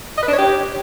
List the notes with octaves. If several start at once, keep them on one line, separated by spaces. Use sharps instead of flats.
D#5
B4
D4
C#5
G4